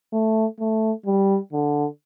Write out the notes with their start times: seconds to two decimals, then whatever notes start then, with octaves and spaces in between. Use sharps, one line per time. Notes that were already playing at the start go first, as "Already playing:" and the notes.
0.13 A3
0.59 A3
1.06 G3
1.53 D3